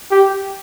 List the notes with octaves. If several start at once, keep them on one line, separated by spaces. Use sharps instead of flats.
G4